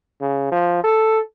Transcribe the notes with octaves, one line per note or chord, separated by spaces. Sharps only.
C#3
F3
A4